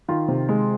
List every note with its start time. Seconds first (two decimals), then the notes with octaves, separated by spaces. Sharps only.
0.08 D#3 F4
0.28 C3
0.49 G#3